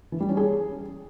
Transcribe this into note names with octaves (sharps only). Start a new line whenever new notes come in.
E3
G3
C#4
G#4